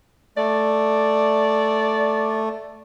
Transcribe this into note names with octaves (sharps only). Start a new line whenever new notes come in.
A3 D5